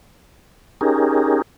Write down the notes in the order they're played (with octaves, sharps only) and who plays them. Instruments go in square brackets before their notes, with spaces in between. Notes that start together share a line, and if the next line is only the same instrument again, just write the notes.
[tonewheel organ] C#4 D#4 G4 G#4 A#4